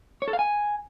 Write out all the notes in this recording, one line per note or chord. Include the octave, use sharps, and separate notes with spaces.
C#5
A4
F5
G#5